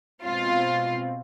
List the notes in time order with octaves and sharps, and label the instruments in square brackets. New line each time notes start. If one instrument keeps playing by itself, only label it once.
[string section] B2 G#3 C4 F4